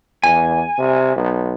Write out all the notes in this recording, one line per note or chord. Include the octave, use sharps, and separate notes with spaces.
E2 G#5
C3
B1